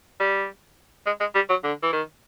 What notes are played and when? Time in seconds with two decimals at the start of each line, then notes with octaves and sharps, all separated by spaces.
0.20 G3
1.06 G#3
1.20 G#3
1.35 G3
1.49 F#3
1.63 D3
1.83 E3
1.93 D#3